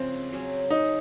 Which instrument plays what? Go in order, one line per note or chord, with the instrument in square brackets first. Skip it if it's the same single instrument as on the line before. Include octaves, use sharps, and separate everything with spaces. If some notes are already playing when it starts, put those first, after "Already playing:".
Already playing: [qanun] C#3 F3 G#3 [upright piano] C4
[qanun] F#3 C#4 G#4
[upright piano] D#4